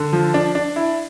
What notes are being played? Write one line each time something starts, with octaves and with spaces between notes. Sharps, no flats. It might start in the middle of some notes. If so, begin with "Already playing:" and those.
Already playing: D3
F3
D4
D4
E4